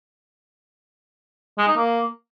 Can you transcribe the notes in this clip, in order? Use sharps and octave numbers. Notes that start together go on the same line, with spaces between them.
G#3
D#4
A#3